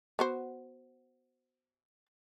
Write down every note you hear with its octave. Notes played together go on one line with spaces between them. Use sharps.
B3 F#4 C5